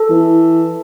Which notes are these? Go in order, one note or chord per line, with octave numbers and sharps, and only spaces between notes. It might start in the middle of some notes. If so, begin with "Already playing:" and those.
Already playing: A4
E3